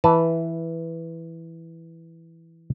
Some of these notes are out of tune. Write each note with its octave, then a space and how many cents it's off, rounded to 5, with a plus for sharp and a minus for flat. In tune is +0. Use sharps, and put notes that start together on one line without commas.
E3 +0 B4 +0 A5 +0